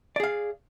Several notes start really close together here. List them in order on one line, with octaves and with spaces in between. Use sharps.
D5 G#4 F5